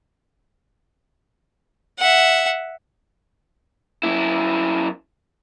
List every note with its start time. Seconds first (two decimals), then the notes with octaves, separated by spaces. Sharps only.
1.99 E5 F#5
4.03 F#2 E4